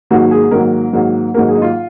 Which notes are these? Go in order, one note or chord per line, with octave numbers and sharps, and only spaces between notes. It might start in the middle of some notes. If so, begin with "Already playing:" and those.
G#2 D#3 F#3 A#3 F#4
G#4
G#2 D#3 F#3 A#3 A#4
G#2 D#3 F#3 A#3
G#2 D#3 F#3 A#3 A#4
G#4
D#4
F4